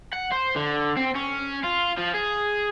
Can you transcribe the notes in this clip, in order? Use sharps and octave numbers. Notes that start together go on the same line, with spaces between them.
F#5
C5
D3
C4
C#4
F4
F3
G#4